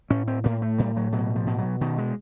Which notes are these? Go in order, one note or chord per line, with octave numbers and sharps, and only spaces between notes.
A2 C#4
C4
A2 A#3
A3
A2 G3
F#3
B2 F#3
F3
B2
F#3
B2 D#3
G#3